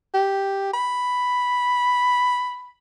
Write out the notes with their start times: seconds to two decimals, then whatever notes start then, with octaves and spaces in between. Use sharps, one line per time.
0.14 G4
0.73 B5